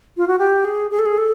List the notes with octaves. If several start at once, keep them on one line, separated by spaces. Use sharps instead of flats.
F4
F#4
G4
G#4
G#4
A4
G#4
A4